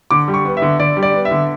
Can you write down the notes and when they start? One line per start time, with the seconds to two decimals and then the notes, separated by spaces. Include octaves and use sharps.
0.11 D3 D6
0.28 G3
0.34 C#6
0.45 B3
0.57 E5
0.62 D3
0.79 D3 D5
0.97 G3
1.03 D5
1.14 B3
1.25 E5
1.31 D3